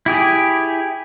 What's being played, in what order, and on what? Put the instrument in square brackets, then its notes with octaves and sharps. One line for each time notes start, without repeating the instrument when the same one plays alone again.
[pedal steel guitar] E4 G4 G#4